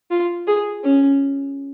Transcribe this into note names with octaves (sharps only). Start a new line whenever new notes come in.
F4
G#4
C#4